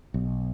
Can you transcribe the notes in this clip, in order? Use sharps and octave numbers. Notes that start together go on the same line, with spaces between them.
B1